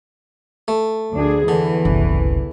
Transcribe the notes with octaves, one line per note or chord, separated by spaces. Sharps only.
A3
D2 D4 G#4
E2 D3 E3
F#1 C2